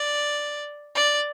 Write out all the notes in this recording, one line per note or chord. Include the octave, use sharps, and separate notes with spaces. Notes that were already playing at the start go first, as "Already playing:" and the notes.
Already playing: D5
D5